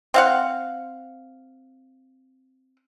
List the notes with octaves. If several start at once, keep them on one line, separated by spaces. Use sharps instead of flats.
C4 F5 F#5